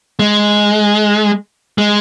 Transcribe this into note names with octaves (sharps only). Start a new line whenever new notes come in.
G#3
G#3